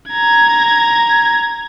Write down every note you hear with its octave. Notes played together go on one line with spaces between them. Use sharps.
A#5 G#6